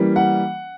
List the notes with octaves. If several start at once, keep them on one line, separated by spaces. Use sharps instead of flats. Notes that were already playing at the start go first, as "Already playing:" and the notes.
Already playing: E3 G3 A#3 C#4
F#5